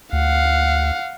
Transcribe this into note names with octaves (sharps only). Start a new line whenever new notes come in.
D2 F5 F#5